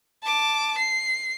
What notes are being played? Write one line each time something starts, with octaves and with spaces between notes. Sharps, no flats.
A5 D6
C7